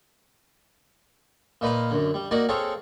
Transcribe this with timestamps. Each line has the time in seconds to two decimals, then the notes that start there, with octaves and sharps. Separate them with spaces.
1.61 A#2 D#4 B4 F5
1.91 F#2 D3
2.14 G3
2.31 A#3 D#4 F#4 D5
2.49 C4 G#4 A4 C#5 F5